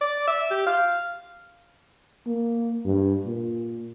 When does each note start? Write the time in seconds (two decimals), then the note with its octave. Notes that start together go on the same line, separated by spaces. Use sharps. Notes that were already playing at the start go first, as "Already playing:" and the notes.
0.01 D5
0.28 E5
0.51 G4
0.67 F5
2.26 A#3
2.85 G2
3.26 A#2